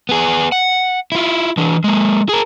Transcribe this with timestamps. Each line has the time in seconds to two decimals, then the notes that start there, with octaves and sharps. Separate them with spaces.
0.09 B3 G#4
0.52 F#5
1.12 E4 F4
1.57 E3 D4
1.84 G#3 A#3
2.29 G#4 A#4